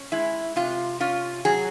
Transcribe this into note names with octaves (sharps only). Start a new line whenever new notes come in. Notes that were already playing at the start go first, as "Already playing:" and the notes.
Already playing: C#4
G#3 E4
C3 F4
C#4 F4
F#3 G#4